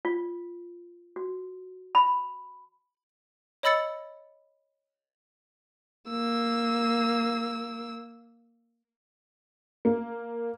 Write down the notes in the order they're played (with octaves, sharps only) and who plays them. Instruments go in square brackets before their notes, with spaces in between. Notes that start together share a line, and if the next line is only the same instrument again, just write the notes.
[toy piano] F4
F#4
B5
[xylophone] C#5 D#5 B5 E6 A6 C#7
[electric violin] A#3 E6
[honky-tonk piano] A#3